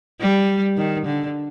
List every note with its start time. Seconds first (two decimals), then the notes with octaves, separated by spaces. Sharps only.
0.20 G3
0.77 D#3
1.06 D3